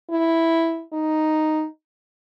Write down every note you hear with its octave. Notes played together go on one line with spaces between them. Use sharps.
E4
D#4